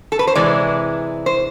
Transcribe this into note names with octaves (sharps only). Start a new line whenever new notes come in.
A4
B4
C5
C3 E3 G#3 D5
C5